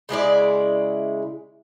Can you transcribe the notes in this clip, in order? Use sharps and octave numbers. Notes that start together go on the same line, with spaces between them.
C#3 G#3 E4 D5